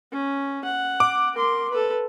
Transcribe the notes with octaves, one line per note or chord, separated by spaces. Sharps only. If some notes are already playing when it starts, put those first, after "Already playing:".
C#4
F#5
D6
A#4 C6
A4 B4